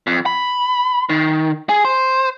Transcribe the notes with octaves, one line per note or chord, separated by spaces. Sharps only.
F2
B5
D#3
G#4
C5